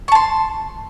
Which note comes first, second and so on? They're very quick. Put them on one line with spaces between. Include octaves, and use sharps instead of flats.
C#6 A5 C6